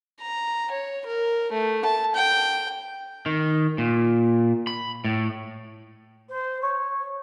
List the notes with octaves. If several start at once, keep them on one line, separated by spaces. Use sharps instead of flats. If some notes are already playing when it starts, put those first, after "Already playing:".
A#5
C#5
A#4
A3
A5
G5
D#3
A#2
B5
A2
C5
C#5